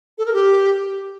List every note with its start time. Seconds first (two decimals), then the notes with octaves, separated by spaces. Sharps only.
0.18 A4
0.26 A#4
0.34 G4